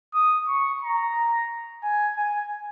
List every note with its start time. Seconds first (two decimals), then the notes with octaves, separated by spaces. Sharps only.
0.14 D#6
0.48 C#6
0.82 A#5
1.83 G#5
2.16 G#5